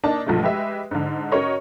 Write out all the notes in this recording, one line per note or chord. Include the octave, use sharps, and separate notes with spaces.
A#3 D4 D#4 A5
B1 G2 F3 G#3 A3
G#3 G4 B4 D#5 E5
G#2 D3
C#4 F#4 A#4 C#5 D#5